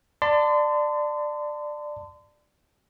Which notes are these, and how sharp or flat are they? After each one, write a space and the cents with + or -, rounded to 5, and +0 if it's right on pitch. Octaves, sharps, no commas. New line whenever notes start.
D5 +15 A5 +25 C6 -35